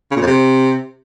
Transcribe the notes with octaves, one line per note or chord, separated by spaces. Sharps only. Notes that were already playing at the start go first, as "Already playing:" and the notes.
C#3
A#2
F2
C3